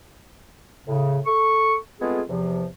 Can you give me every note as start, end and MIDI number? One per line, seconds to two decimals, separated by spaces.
0.87 1.19 45
0.87 1.19 49
1.26 1.75 69
1.26 1.75 85
2.01 2.21 56
2.01 2.21 57
2.01 2.21 59
2.01 2.21 60
2.01 2.21 65
2.01 2.21 68
2.29 2.65 40
2.29 2.65 48
2.29 2.65 53